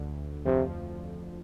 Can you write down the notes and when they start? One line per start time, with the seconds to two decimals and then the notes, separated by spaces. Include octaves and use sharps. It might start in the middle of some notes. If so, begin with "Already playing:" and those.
Already playing: D2 D3
0.46 F2 C3 F3